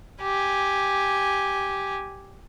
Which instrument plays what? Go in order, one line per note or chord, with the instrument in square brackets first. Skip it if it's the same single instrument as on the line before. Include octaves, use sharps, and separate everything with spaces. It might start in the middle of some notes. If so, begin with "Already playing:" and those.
[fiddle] G4 G#5